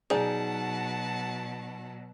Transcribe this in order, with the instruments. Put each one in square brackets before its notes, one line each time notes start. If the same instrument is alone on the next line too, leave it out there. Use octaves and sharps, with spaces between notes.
[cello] B2 F#3 [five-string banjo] D#4 D5 G#5 [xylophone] G#4 [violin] F#5 A5